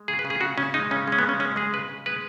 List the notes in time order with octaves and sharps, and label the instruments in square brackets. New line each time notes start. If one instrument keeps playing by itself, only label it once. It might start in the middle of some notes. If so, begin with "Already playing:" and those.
Already playing: [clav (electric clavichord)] G#3
C#3 G#4
B4
C#3
G#4
C#3 F#4
C#3 C#4
G#3 D#4
C#3 C#4
G#3 C#4
B3
C#3
C#4
G#3 C#4
G#3 G#4
C#3 B4
C#3
G#3 B4